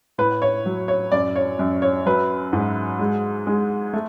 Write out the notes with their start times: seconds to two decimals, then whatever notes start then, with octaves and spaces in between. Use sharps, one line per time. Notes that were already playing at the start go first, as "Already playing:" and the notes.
0.18 A2 B4
0.42 C#5
0.66 F#3
0.88 C#5
1.12 F#2 D5
1.36 C#5
1.59 F#2
1.82 C#5
2.06 F#3 B4
2.53 G#2
2.99 G#3
3.47 G#3
3.93 A3